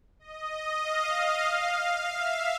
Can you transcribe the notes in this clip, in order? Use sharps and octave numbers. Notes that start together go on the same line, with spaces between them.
D#5
F5
E5